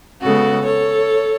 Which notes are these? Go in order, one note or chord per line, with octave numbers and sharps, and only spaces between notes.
C#3 G#3 B3 F#4 A4
A4 C#5